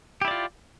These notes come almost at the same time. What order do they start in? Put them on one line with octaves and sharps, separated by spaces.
G4 E4 D5 F4